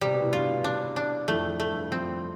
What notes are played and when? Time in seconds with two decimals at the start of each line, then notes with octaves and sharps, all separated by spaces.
0.01 C3 G3
0.11 B2
0.21 A2
0.31 G2 B2 F4
0.64 D4
0.96 D4
1.28 F2 A2 A3
1.60 A3
1.71 G2
1.91 F2 C4